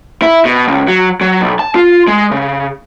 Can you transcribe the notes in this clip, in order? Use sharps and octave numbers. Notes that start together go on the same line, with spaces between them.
E4
B2
C#2
F#3
F#3
B1
A5
F4
G#3
C#3